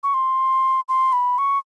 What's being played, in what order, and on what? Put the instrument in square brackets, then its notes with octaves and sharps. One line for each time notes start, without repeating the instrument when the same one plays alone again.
[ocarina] C#6
C6
C6
B5
C#6